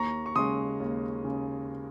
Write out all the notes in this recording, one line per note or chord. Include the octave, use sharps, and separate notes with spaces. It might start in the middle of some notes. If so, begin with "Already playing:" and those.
Already playing: D#2 A#5 C#6
C#6
C#3 G#3 C6 D#6
D#2
C#3